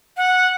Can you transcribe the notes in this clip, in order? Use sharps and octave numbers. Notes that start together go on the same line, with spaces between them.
F#5